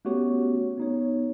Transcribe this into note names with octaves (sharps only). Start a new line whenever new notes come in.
A3 B3 C#4 F#4 G4 C#5
B3 D#4 C#5